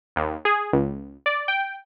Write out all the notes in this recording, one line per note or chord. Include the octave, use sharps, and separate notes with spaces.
D#2
G#4
C#2
D5
G5